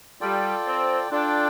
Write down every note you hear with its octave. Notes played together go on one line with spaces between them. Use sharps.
G3 F4 A4 D5 G5
C4
D4 F4 A4 D5 G5